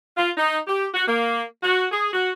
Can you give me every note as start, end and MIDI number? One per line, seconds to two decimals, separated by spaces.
0.17 0.30 65
0.38 0.58 63
0.67 0.86 67
0.95 1.03 66
1.07 1.42 58
1.62 1.86 66
1.92 2.09 68
2.13 2.31 66